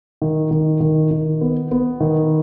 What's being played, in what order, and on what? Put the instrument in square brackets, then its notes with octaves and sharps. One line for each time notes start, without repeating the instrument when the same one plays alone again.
[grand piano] D#3
D#3
D#3
D#3
B3
B3
D#3